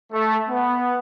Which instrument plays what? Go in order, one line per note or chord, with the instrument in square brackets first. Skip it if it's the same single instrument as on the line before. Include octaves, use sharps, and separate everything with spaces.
[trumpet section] A3
B3